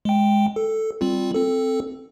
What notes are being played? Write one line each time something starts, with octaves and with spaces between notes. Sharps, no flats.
G#3 G5
A4
G3 C4 F4
C4 A4